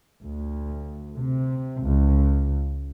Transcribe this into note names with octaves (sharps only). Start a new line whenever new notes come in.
D2
C3
C#2